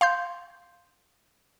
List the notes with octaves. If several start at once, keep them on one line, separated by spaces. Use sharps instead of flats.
F5 C6 G6